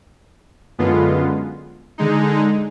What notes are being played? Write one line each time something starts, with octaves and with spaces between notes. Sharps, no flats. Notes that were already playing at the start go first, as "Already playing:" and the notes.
F#2 D3 G#3 B3 F4
D3 G#3 D#4